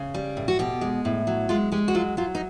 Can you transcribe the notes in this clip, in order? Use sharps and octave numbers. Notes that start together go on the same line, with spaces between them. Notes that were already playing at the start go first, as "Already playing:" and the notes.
Already playing: C#3
G3
A2
F#4
B2 G4
G#3
A2
F#3
G#3 F4
G#3 G4
F#4
F#3 F4
F#3 F4
D#4